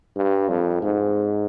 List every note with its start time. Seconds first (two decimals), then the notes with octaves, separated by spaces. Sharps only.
0.16 G2
0.49 F2
0.82 G#2